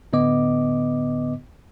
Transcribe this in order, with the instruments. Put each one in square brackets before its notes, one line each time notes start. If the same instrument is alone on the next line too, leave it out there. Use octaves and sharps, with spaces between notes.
[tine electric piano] A2 D3 B3 D#5 D6